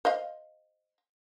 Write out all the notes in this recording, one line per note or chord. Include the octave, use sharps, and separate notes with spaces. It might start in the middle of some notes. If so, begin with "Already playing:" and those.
C5 D#5 F5